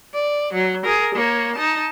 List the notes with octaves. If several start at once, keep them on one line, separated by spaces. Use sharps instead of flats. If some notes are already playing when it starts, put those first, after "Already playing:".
D5
F#3
G#4 A#4
A#3 C#5
D#4 A5